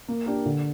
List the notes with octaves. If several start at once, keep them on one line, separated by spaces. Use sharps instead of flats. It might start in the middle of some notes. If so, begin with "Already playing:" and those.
A#3
D4 G4 A#4
D3